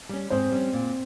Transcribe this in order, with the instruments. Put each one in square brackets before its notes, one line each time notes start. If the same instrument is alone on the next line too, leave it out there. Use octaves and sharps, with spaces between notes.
[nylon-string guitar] G3 C#4
[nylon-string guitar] G#2 [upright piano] C4 C5
[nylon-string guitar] G3 C#4
A#2